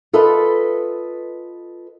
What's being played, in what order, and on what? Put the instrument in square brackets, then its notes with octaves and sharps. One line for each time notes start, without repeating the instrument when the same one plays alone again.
[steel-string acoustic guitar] F4 A4 B4 D#5